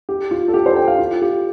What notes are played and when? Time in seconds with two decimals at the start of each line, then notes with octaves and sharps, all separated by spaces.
0.09 G4
0.31 F4
0.48 A4
0.54 G4
0.66 C5
0.76 G5
0.88 F5
0.99 F4
1.21 G4